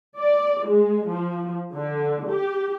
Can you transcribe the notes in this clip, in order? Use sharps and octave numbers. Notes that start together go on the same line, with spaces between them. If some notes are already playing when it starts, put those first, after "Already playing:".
D5
G#3
F3
D3
G4